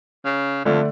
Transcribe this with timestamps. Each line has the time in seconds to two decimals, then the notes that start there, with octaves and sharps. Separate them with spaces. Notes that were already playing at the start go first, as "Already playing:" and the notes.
0.25 C#3
0.65 F2 D3 A3 D4